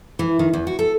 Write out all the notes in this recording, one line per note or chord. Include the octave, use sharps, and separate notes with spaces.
E3
D#3
E2
F#4
A4